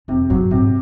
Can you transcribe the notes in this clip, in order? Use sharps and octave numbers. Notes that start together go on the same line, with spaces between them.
F2 C3
G2 F#3
G#2 C3